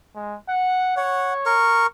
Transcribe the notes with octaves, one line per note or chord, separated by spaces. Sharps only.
G#3
F#5
C#5 F#5
A#4 C#6